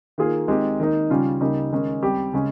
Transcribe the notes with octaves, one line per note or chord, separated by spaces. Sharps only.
D#3 A#3 F4 G#4
D#3 G#3 C4 G4
D#3 A#3 D#4
C#3 G3 C#4 F4
C#3 G3 A#3 D#4
D#3 G#3 C#4
G3 C4 G4
C#3 G#3 C#4